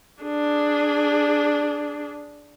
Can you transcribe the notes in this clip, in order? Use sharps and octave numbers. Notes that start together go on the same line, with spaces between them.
D4 G#4